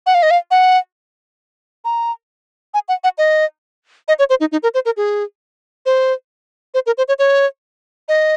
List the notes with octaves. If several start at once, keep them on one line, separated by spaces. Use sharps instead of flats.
F#5
F5
D#5
F5
F#5
A#5
G#5
F#5
F#5
D#5
D#5
C#5
C5
D#4
D#4
A#4
C5
A#4
G#4
C5
C5
A#4
C5
C#5
C#5
D#5